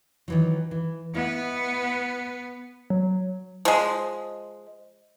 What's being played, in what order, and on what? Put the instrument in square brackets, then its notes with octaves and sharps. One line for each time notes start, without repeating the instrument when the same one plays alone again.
[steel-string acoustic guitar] D#3 E3 F#3
E3
[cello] B3 [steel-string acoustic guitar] E4 D#5
[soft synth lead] F#3
[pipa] F3 G#3